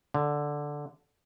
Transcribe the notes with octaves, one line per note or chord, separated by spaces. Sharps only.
D3